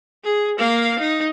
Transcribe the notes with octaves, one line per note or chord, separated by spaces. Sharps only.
G#4
A#3 F5
D#4